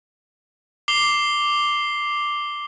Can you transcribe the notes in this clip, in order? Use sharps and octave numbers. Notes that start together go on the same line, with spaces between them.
D6 C7 F7 G7